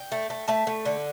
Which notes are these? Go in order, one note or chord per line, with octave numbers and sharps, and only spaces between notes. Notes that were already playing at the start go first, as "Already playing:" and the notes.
Already playing: G5
A3
A3
A3 E5 A5
A3
D3